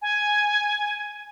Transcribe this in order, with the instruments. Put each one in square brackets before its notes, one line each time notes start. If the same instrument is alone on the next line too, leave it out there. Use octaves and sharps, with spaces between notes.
[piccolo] G#5